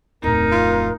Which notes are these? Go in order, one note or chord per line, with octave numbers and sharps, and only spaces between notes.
D1 F2 D#4 A#4
F4